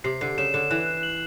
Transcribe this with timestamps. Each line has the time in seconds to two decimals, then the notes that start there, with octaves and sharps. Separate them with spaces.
0.04 C3 C7
0.21 D3 C7
0.38 C#3 E7
0.54 D3 E7
0.70 E3 F#6
0.86 F#6
1.03 F#7